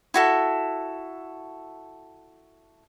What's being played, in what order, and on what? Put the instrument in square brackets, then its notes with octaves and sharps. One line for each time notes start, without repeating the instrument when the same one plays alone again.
[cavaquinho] E4 F#4 A4